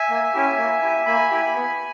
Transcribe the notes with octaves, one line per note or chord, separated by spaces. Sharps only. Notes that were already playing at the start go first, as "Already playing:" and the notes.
Already playing: E5 G#5
A#3
C#4 E4 G4
A#3
E4 G4
A#3 G#5 B5
E4 G4
B3